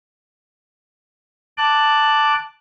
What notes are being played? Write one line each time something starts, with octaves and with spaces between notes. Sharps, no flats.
A5 D6 F#6